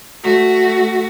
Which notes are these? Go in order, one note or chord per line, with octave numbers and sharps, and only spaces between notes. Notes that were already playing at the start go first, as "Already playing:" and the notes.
A3 F#4